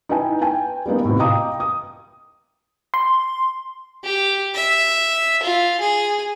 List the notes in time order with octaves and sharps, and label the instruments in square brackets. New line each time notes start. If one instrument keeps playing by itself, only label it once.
[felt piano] D#4 E4 B4 G5 G#5
B4 G5 G#5
G3 A#3 B3 D#4
A2 C3
D#5 F5 G5 A#5 D6 D#6
D#6
[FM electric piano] C6
[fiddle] G4
E5
F4
G#4